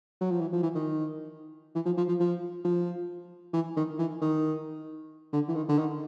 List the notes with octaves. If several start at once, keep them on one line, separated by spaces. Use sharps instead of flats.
F#3
F3
E3
F3
E3
D#3
E3
F3
F3
F3
F3
F3
E3
D#3
E3
D#3
D3
E3
D#3
D3
D#3